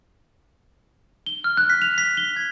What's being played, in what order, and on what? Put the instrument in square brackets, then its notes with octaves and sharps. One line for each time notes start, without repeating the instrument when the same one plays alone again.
[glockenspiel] G7
F6
F#6
B6
F7
B6
G7
G#6